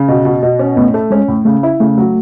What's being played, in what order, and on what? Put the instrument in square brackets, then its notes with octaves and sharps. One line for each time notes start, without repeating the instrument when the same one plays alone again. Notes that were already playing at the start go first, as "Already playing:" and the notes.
Already playing: [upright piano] C#3
B2
B2
B2
C#4
[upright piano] A2 [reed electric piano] B3
[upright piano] A3
[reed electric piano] G#3 [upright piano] C#4
[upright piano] A2
[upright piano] C#3 [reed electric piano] A3
[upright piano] E4
[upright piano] C#3 [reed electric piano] A3
[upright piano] F#3